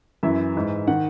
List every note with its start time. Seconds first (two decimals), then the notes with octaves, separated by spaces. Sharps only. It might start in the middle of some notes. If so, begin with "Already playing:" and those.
0.23 F#2 E3 E5
0.55 G#2 E3
0.87 D#3 F#5